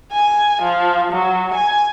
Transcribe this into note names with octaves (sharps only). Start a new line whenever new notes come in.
G#5
F3
F#3
G#5